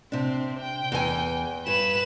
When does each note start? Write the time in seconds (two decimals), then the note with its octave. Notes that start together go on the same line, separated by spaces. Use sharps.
0.12 C3 C4 D4
0.60 G5
0.92 E2 G#5
1.67 G2 B4 E7